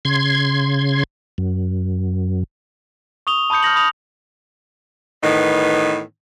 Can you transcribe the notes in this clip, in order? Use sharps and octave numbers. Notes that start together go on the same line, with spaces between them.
C#3 C6 G#6
F#2
C#6 D#6 F7 G7
A5 B5 D#6 G6 C#7
F6 G6 A#6 F#7
B5 D#6 F7
A2 D#3 E3 B3 D#4